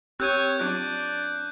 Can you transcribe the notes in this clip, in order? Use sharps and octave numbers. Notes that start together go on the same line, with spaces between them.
C4 G4 C#5 F#6 G6 D#7
F#3 D4 F4 F#6